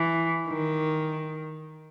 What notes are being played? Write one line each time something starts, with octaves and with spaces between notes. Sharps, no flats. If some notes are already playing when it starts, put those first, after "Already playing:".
Already playing: E3
D#3